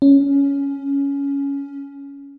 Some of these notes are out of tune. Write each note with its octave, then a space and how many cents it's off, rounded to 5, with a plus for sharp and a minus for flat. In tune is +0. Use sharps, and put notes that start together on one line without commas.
C#4 +10